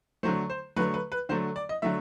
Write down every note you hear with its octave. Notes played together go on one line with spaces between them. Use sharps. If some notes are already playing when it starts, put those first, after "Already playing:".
D3 F#3 A3 C5
C5
D3 F#3 A3 B4
B4
B4
D3 F#3 A3 C5
D5
D#5
D3 F#3 A3 E5